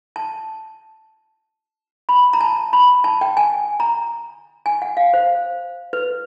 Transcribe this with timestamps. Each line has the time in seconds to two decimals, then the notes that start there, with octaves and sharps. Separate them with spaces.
0.16 A5
2.09 B5
2.33 A#5
2.41 A5
2.73 B5
3.04 A5
3.21 G5
3.37 G#5
3.80 A#5
4.66 G#5
4.82 F#5
4.97 F5
5.14 C5
5.93 B4